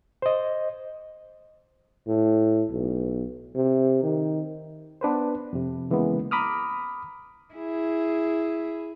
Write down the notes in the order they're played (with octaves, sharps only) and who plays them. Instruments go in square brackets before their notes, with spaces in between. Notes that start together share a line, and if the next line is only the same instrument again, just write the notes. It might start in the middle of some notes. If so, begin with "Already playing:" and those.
[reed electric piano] C5 D#5
[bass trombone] A2
B1
C3
D#3
[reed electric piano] B3 D4 B4 C5
F2 C3
C#3 E3 G#3 A#3 B3
A#5 B5 D6 D#6 F6
[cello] E4 G#4